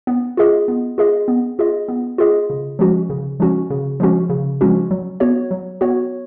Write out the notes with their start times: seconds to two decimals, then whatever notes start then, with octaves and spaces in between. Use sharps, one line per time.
0.07 B3
0.37 F4 G#4 D#5
0.68 B3
0.98 F4 G#4 D#5
1.28 B3
1.59 F4 G#4 D#5
1.88 B3
2.18 F4 G#4 D#5
2.50 C#3
2.79 F3 G#3 C#4 F#4
3.10 C#3
3.40 F3 G#3 C#4 F#4
3.70 C#3
4.00 F3 G#3 C#4 F#4
4.29 C#3
4.61 F3 G#3 C#4 F#4
4.91 F#3
5.20 B3 F#4 C#5
5.51 F#3
5.81 B3 F#4 C#5